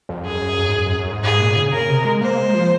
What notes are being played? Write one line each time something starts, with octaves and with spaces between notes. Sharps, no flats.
F2
F#2 G#4
F#2
F#2
G#2
F#2
F#2
F#2
G#2
G#2 G#4
A#2
C#3
C#3 A#4
C3
G#3
A#3 C5
G#3
F3